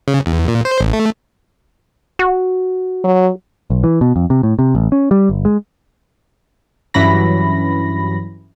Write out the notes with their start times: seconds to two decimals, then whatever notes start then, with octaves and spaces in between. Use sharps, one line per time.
0.08 C#3
0.26 E2
0.48 A#2
0.65 C5
0.80 A1
0.93 A3
2.19 F#4
3.04 F#3
3.70 B1
3.84 E3
4.01 B2
4.16 F2
4.30 C3
4.43 A2
4.59 C3
4.75 A1
4.92 C#4
5.11 G3
5.30 G1
5.45 G#3
6.94 G2 E3 F#3 C#4 B5 A#6